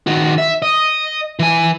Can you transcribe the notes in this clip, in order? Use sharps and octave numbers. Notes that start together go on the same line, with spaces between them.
D#3 F#4
E5
D#5
E3 G#5